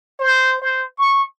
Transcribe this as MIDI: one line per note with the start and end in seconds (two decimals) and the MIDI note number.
0.19 0.61 72
0.61 0.84 72
0.98 1.22 85